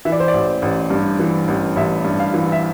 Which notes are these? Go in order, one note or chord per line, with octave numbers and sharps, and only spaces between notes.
E3 E5
D5
C5
D5
A1
A1
G2
E3
A1
A1 E5
G2
F5
E3
E5